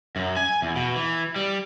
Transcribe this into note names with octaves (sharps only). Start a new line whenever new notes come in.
F#2
G#5
E2
B2
E3
G3